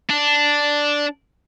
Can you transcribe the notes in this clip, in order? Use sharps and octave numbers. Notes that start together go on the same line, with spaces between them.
D4